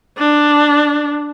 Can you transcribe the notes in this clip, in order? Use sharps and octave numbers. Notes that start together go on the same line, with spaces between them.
D4